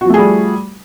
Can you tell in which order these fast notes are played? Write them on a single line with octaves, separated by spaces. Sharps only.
F#4 F3 A3 G#4 G3